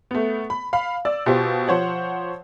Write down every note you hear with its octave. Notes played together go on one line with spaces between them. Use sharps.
A3 B3
B5
F5 B5
D5 E6
B2 F4 G4 C5
F3 C5 C#5 F#5